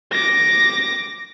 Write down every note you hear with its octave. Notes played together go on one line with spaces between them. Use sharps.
D6 A#6